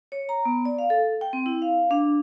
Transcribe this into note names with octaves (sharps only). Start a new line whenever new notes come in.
C#5
A#5
B3
D5
F5
A4
G5
C4
E4
F5
D4